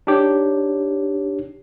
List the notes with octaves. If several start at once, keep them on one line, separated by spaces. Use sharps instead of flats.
D4 D#4 G4 C#5